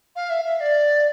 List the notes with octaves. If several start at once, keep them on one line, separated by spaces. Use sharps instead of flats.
F5
E5
E5
D5